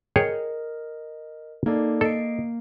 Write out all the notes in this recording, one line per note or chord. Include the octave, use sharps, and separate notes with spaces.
G#4 A#4 C#5 D#5 G5
A#3 D#4 A4 D5
A4 D#5 C7 D7